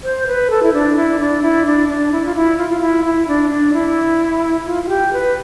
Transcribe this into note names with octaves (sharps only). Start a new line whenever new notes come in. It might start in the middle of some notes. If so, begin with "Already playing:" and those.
C5
B4
A4
E4
D4
E4
D4
E4
D4
D4
E4
F4
E4
F4
F4
E4
E4
D4
D4
E4
F4
F4
G4
B4